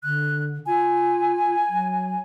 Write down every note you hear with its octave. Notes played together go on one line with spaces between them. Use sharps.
D3 F#6
F4 G#5
F#3